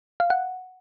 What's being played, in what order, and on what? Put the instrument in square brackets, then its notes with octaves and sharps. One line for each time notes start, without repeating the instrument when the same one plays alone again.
[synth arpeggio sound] F5
F#5